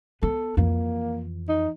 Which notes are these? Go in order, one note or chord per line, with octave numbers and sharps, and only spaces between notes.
B3 A4
F2 E3 A#3
D#4